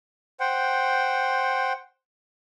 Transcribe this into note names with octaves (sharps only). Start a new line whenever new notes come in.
C5 F#5 G5